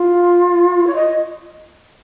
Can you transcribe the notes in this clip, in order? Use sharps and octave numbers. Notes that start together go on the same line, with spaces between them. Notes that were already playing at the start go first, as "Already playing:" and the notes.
Already playing: F4
C#5
D#5